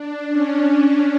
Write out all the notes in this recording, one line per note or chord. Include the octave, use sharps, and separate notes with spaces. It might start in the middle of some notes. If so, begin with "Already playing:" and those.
Already playing: D4
C#4